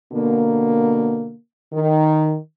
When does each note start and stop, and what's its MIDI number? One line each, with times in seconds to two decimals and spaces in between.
0.13 1.34 47
0.13 1.34 50
0.13 1.34 58
1.74 2.34 51